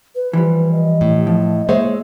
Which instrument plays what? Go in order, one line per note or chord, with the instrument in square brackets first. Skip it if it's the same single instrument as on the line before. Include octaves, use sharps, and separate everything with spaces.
[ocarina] B4
[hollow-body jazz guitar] E3 F3 G3
[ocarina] D#5
[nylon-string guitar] A2
[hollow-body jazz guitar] F3
[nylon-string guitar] G#3 [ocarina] A#3 [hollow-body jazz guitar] C5 C#5 E5